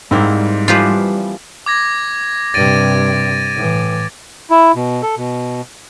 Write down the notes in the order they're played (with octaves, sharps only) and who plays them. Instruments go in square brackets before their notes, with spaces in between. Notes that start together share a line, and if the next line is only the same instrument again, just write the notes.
[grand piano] G#2 [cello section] G3 [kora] A#3 C4 E4
[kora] E3 F3 [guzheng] F4 G4 B4
[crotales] D6 G#6 A#6
[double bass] G2 C3 [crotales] A6 D7 D#7
[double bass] A2 E3
[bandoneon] E4
B2
A4
B2